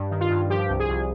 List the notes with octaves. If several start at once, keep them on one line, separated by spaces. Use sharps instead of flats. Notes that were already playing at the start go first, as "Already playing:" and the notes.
Already playing: G2
D#3
F4
G2
F3 G4
C2
G#4
C2